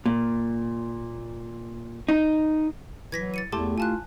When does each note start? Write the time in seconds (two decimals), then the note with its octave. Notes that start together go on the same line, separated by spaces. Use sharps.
0.06 A#2
2.09 D#4
3.12 E3 F#3 G#6 A#6 B6
3.34 A6 C#7 D#7
3.52 E2 A3 E4 G4 A5 C6 D6
3.78 F4 G#5 A5 F#6